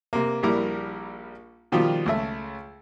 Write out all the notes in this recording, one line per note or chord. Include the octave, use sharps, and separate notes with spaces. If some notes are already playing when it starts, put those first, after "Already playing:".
C3 A#3
A#1 G3 E4 A#4 D6
B2 D#3 F3 G3 F4 G4
C#2 A3 E5